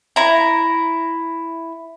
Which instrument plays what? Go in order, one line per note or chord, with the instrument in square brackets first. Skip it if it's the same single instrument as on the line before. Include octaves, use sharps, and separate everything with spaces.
[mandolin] E4 A#5